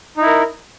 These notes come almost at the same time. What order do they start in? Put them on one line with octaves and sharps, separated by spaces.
D#4 E4 A#4